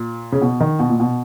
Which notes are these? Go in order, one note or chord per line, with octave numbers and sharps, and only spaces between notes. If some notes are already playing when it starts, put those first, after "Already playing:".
Already playing: A#2
C#3
B2
D#3
B2
A#2
B2